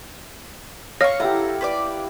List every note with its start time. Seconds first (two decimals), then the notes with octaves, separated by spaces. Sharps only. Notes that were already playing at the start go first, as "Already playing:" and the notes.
1.01 C#5 F5 C#6 D#6
1.20 E4 G4 A4 F#5 A#5
1.61 B4 C5 D5